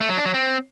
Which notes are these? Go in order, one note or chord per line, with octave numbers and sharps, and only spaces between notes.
A3
F#3
D4
F#3
C4